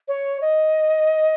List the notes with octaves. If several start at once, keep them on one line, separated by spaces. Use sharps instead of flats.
C#5
D#5